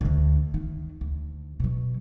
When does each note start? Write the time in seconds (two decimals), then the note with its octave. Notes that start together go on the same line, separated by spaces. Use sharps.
0.01 D2 D3
0.54 D#3
1.01 D2
1.60 B2 F#3